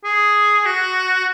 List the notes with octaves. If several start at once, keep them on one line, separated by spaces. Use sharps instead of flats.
G#4
F#4